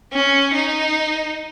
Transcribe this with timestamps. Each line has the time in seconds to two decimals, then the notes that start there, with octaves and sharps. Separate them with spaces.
0.13 C#4
0.53 D#4